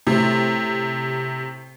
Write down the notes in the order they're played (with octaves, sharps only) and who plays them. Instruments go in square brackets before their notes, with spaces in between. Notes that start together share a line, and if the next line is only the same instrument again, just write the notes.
[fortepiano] A2 C4 [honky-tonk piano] C3